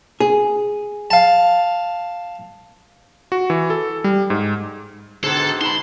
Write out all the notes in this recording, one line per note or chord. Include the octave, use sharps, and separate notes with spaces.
G#4
F5 A5
F#4
E3
A4
G3
G#2
G#2 B2 D3 G#4 A4
D#4 A5 B5 C6